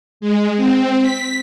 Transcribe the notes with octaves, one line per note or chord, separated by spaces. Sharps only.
G#3
C4
B6